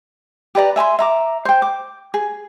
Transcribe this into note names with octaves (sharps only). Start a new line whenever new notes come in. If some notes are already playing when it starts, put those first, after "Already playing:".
G4 B4 D5 A#5
E5 G#5 B5 C6
E5 A#5 D6
C5 G5
D6
G#4